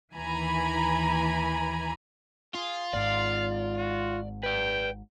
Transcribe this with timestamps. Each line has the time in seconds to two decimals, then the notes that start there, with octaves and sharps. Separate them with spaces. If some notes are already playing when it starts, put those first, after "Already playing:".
0.15 D#2 E3 G#5 A#5 B5
2.55 F4 G#4
2.93 G#1 G#2 D5 F5
3.77 F#4
4.43 B4 D5 G5